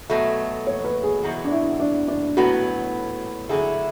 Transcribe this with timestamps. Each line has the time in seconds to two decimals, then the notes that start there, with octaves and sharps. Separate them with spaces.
0.10 B2 F#3 A3
0.67 C#5
0.84 B4
1.03 G#4
1.23 E2 B2 F#3
1.44 D4
1.51 E4
1.80 D4
2.08 D4
2.37 A2 F#3 B3 F#4
3.49 D3 F#3 A3 E4 G#4